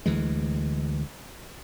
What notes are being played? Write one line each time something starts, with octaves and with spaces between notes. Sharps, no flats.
D2 E3 G#3